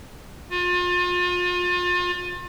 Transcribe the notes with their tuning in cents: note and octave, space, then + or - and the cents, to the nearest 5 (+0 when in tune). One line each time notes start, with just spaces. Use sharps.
F4 +35